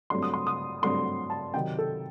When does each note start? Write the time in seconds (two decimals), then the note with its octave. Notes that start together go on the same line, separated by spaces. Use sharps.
0.10 G2 F#3 A3 C4 C6
0.23 D#6
0.34 C6
0.47 D#6
0.82 G2 F#3 A3 C4 C6
1.30 A5
1.54 C3 D#3 F#3 G5
1.79 A4